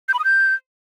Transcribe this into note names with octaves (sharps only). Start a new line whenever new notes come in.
G6
B5
D#6
G6